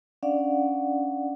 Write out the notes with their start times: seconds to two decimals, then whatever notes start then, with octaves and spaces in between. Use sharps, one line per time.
0.23 C#4 D4 D5 F5 F#5